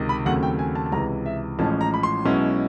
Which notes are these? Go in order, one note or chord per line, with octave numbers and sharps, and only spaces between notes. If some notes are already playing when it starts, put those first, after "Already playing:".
Already playing: C#2 C3 D#3
B5
D#2 C#3 F#3 A3 C4 F#5
G5
G#5
A5
A5
C#2 C3 E3 A#5
E5
A1 A2 F3 G#3 C#4 A5
A#5
B5
C6
B1 B2 G#3 C#4 E4